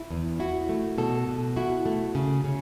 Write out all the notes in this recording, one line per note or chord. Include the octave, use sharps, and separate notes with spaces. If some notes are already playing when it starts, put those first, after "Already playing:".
Already playing: E4
E2
E4 F#4
A3
B2 A4
B2
E4 F#4
A3
C#3
C#3